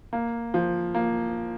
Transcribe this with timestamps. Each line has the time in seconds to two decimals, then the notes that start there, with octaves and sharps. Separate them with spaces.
0.13 A#3
0.54 F3
0.95 A#3